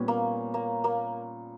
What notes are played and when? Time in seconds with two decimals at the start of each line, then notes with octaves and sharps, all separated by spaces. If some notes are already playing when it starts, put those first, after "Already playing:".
Already playing: A#2 G3 B3 C#4
0.08 A#3
0.54 A#3
0.84 A#3